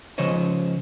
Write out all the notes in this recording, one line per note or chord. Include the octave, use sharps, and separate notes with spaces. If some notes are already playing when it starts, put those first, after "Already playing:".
C#3 F3 C5 C#5 D#5